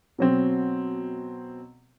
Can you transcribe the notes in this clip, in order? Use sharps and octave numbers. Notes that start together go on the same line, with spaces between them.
B2 F#3 C4